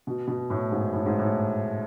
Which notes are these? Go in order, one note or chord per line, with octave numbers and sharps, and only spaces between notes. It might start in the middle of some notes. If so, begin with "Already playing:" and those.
B2
B2
A2
G#2
A2
G#2
A2